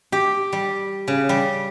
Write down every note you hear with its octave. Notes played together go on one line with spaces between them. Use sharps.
G4
G3
C#3
G3